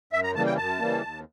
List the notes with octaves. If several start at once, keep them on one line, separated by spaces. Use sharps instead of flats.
F#2 E5
A#5
C#3 E3 G3 A#3 A5
G5
F#2 A5
C#3 E3 G3 A#3
D#2